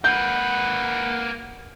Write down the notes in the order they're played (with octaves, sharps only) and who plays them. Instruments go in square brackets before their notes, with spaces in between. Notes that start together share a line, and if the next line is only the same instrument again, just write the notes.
[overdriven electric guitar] A#3 B4 [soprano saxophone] F#5 [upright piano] G6